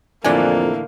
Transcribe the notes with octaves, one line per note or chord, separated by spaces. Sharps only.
F2 A2 D3 E3 A#3 D5 G#5